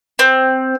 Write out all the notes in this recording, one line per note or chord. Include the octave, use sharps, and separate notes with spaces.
C4